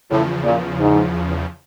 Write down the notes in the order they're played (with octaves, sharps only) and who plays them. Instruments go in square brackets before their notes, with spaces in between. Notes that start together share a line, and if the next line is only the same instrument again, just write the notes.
[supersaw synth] E2 C#3 F3 [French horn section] A2
[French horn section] A#2
G#2